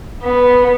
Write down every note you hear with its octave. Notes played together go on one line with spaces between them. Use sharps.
B3